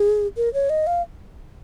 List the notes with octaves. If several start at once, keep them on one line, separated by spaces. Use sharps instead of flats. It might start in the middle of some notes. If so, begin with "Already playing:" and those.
Already playing: G#4
A#4
C#5
D#5
F5